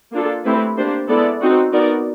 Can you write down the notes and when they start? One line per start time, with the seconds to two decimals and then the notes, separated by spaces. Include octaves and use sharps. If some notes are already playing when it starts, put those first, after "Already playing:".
0.12 A#3 D4 F4 A4
0.44 A3 C4 E4 G4 B4
0.77 A#3 D4 G4 C5
1.09 G#3 B3 E4 A4 D5
1.40 C4 D#4 F#4
1.73 B3 D#4 F#4 A#4 D5